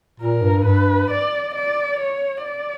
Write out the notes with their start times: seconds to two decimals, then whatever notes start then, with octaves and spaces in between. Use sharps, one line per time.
0.20 A#2 A#4
0.42 G2
0.65 G2 B4
1.10 D5
1.54 D5
1.99 C#5
2.43 D5